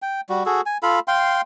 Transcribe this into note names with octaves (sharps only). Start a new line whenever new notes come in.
G5
G3 F#4
F#4 G#4 A4
G#5
F4 A4 F5 B5
F5 G5 C6